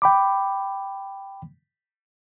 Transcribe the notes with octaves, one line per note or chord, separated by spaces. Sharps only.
G5 B5 D6